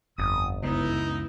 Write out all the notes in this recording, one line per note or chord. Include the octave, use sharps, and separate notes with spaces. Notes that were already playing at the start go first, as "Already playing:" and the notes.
G1 F2 D#6
C#2 F#2 C#3 B3 D#4 E4